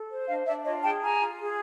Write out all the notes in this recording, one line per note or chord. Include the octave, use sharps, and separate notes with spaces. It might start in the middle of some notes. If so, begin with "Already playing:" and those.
Already playing: A4
C5
D4 D#5 F5
D4 D5 E5
F4 C#5 D#5
G#4 G5 A5
F4 G#5 A#5
F4
G#4